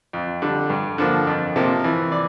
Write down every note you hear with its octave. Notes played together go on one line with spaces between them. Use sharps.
F2
D3 G3
G2
D3 F3 A#3
F2
C3 F3 A#3
E3
D5